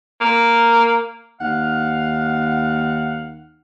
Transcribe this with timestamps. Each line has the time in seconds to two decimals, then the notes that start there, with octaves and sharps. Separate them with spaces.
0.21 A#3
1.41 D#2 F5 F#5